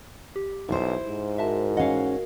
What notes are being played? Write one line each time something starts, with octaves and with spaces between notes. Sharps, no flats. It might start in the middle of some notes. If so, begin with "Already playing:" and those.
G4
B1 E4 C5
G#2
F#4 A#4 E5 A5
C#4 D#5 F5 F#5